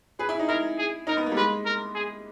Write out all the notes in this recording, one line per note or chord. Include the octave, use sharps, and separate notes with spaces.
G#4 B4
E4
D#4
E4 A#4
G#4
D#4 A#4
B3
A#3
G3
G#3 B4
A#4
G#4